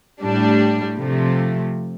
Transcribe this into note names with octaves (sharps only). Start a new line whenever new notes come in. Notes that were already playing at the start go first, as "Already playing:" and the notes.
A2 G3 D4
C3 F3 A3